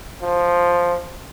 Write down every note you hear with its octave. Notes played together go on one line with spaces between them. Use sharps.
F3